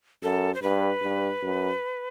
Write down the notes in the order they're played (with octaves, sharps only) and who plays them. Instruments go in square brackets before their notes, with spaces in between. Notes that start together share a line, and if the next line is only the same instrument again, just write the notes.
[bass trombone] F#2 [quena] A4
[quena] C5
[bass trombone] G2 [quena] B4
[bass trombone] G2
F#2